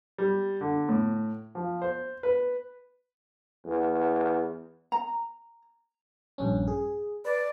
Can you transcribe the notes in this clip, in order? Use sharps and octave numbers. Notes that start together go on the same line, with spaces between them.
G3
D3
A2
F3
C5
B4
E2
A#5
A#1 G2 C#4
G#4
B4 D5